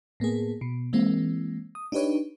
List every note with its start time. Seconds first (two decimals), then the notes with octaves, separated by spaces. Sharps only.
0.20 A2 A#3 B3 G#4
0.61 B2
0.93 E3 G#3 A#3 C4
1.75 D#6
1.92 D4 D#4 G4 B4 C#5